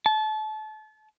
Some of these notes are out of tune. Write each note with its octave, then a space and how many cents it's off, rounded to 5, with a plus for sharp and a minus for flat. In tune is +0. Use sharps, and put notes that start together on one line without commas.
A5 -30